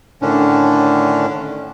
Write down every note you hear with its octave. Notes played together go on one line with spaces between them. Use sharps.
A2 D3 D#3 C#4 D4